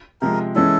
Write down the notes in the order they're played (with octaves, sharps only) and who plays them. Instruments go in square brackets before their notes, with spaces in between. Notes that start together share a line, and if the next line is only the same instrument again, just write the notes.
[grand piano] C3 F3 G#3 [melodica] A#4
[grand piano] E3 G#3 C#4 E4 [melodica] A4